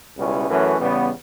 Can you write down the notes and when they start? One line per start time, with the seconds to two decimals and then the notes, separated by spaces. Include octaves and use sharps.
0.17 C#2 B2 G3 C#4 E4
0.49 F#2 E3 A3 C#4
0.79 E2 C#3 G3 B3